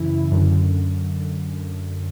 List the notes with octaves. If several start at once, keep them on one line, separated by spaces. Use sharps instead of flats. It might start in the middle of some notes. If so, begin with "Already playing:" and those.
Already playing: F#2 C#3 E3 E4
F#2 D3